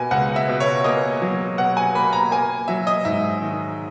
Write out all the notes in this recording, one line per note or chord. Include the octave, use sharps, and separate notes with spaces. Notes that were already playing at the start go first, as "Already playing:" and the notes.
Already playing: B2 A#3 G#5
C#2 F#5
E5
B2
C#5
A#3 D#5
F#3
B2 F#5
G#5
A#3 B5
A#5
A#3 G#5
F#3 E5
D#5
G#2 E5
D#3